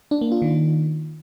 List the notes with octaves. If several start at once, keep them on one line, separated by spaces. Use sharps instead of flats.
D4
A#3
F4
D#3